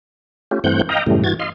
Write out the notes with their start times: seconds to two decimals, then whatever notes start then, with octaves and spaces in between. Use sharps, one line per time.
0.51 A3 C#4 F4 G4
0.64 G2 E3 A3 C4 F#5 G6
0.89 D#5 F5 G5 A#5
1.06 F#2 A2 C#3 E3 G3 A3
1.24 G2 E3 F#4 G#6 A6
1.40 D#5 F5 C6